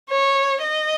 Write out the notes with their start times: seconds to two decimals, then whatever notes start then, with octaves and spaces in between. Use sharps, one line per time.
0.10 C#5
0.62 D#5